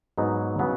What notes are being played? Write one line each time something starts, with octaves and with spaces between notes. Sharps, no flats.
G#2 F#3 B3 D#4
C#3 F#3 B3